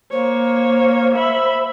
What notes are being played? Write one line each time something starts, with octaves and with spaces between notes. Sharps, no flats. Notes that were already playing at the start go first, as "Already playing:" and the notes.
A#3 C5 C#5
E5 B5